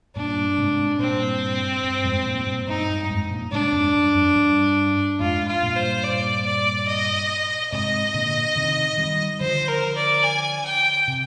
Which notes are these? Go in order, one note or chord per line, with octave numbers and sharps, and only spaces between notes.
G2 A#2 D4
G#2 C3
G2 A#2 C4
G2
F2 G#2
G2 A#2
G2 A#2
G2 D#4
G2
F2 G#2
G2 A#2
G#2 C3 D4
F2 G#2
G2
F2
G2
F2 G#2 F4
F4
G2 A#2
C5
D5
D5
D#5
G#2 C3 D#5
A#2 D3
C3 D#3
D#3 G3
D3 F3 C5
A#4
D5
G#5
G5
C3